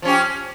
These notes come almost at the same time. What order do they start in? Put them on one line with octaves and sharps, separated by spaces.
F3 C#4 G4